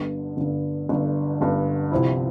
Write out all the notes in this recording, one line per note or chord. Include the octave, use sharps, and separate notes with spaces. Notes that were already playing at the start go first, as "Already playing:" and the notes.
Already playing: G1 G2 D3
G1 G2 D3
G1 G2 D3
G1 G2 D3
C2 C3 F3 C4 E4